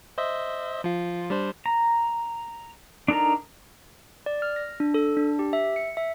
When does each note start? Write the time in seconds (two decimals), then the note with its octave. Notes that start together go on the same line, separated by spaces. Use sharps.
0.18 C5 D#5 E5
0.84 F3 F4
1.30 G3 D4 C5
1.66 A#5
3.08 D4 D#4 A4 A#4 A#5
4.26 D5
4.42 F6
4.56 A#6
4.80 D4
4.94 A4
5.17 D4
5.39 G4
5.53 E5
5.76 C#7
5.97 E5